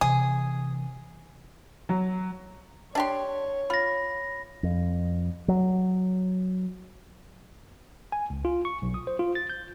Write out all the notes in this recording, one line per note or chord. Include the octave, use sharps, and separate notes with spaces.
C3 E3 G#4
F#3
D4 G4 C#5 C6
F4 B5 A#6
F2
F#3
G#5
C#2
F4
C#6
B1
D#6
C5
F4
A6
G6